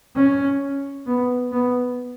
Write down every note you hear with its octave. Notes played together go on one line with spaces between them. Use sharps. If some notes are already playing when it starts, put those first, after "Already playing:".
C#4
B3
B3